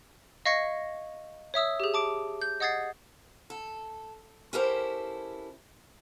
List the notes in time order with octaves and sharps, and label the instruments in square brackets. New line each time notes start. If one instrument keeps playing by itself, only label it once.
[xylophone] D#5 F5 C#6 G#6 A#6 C#7
C#5 E5 D#6 E6
G4 G#4
A5 D6 D7
G6
D#5 F#5 D#6 G#6 A6 C7
[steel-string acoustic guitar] A4
C#4 E4 G4 A4 A#4 C5